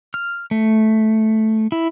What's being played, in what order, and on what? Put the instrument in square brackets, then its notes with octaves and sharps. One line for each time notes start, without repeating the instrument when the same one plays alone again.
[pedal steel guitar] F6
A3
E4